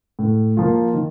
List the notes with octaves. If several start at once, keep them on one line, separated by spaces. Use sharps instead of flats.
A2
F3 A#3 F4
D#3